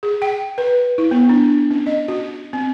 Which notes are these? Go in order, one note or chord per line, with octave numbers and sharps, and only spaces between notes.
G#4
G5
B4
E4
B3
D4
C#4
D#5
F#4
C4